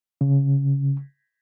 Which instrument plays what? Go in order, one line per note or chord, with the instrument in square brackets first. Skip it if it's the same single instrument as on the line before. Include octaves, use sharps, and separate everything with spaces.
[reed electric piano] C#3